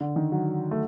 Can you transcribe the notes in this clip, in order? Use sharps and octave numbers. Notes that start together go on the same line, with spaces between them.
D3
D#3
F#3
A3